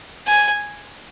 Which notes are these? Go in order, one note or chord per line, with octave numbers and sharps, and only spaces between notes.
G#5